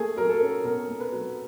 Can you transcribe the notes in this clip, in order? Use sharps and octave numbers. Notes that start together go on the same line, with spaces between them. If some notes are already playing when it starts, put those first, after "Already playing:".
Already playing: A3 G#4
F#3 A#4
A4
C#4
B2 A#4
A3
B4
F#3